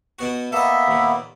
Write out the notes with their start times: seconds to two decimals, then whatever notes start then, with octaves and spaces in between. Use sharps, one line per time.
0.19 B2 B3 F#4
0.52 A#3 B3 A4 D#5 E5
0.87 D#2 A#2